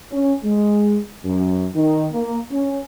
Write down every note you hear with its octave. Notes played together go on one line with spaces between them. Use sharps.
C#4
G#3
F#2
D#3
A#3
C#4